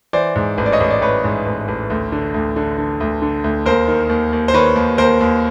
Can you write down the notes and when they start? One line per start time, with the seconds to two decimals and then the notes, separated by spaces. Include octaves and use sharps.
0.13 E3 C5 D5
0.36 G#2
0.58 A1
0.66 D5
0.72 C#5 D#5
0.80 A1
0.90 D5
1.01 A1 B4 C#5
1.24 G#2
1.46 A1
1.68 A1
1.90 D2
2.12 D3
2.34 D2
2.56 D3
2.78 D3
3.00 D2
3.22 D3
3.44 D2
3.66 D#2 A#4 C5
3.88 D#3
4.10 D#2
4.33 D#2
4.48 C5
4.54 D#3 B4 C#5
4.76 D#2
4.98 D#2 A#4 C5
5.21 D#2